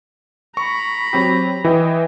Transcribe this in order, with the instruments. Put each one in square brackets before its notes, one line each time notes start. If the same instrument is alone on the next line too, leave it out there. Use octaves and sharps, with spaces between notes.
[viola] A#5 B5 [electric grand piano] C#6
[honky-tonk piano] F#3 C4 G4
[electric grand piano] E3 [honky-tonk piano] D#5 G5